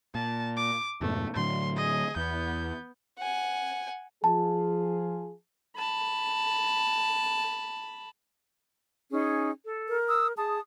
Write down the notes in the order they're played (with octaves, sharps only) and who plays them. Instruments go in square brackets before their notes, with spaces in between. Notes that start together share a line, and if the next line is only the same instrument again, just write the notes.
[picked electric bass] A#2 [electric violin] A5
[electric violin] D6
[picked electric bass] F2 G#2 B2 [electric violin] A3
[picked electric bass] A2 D3 F#3 [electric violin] C6
[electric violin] G#4 D#5
[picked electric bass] E2 [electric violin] B3 G6
[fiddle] F#5 G#5
[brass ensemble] F3 F4 G#4 [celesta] A5
[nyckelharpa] A5 B5
[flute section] C#4 D#4 G#4
A4
[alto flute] A#4
[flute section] D#6 E6
[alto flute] G#4 [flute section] A5 D#6